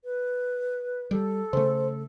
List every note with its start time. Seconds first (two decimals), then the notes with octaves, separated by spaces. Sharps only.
0.04 B4
1.11 G3 A4
1.53 C#3 A3 C5